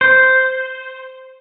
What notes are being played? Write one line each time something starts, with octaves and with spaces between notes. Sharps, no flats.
C5